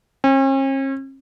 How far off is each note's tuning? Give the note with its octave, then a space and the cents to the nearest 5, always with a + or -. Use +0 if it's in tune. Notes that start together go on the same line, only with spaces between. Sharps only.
C#4 -45